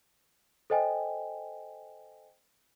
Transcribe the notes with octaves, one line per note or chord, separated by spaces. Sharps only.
A4 C5 D#5 G5 G#5